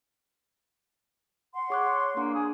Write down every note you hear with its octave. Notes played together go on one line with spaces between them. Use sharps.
F#5 C6
G#4 C#5 D6 F#6
A#3 D4
G#4